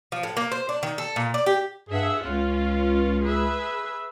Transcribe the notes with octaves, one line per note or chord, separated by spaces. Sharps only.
F3
A2
A#3
C5
D4
D#3
A4
A#2
D5
G4
G2 G#4 E5 F#5
C#2 C#4 F4
G#4 B4 E5